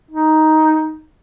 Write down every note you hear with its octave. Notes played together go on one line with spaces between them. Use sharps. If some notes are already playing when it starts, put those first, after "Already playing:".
D#4